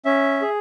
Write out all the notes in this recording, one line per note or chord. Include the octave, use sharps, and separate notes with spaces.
C#4 E5
G#4